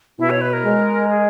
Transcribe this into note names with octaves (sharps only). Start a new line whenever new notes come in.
B2 E4
C#5
B4
A#4
G#3
G#4